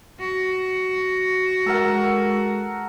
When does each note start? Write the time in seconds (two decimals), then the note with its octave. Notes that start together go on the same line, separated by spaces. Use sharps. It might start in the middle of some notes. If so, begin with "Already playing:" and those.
0.20 F#4
1.66 G#3 A4 A#4 F#5